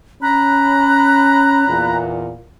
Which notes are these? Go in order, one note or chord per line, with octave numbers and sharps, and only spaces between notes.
C#4 A#5 B5 F#6
E2 A#2